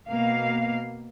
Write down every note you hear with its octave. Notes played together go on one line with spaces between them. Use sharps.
B2 A#3 F5